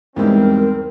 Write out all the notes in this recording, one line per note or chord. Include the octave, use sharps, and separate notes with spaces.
E2 G#2 G3 C4 A#4